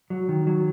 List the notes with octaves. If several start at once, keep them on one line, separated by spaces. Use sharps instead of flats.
F#3
D#3
F#3